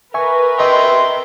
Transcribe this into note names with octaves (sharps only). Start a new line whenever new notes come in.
A#4 B4 E5 G#5 C#6
D#5 E5 G5 C6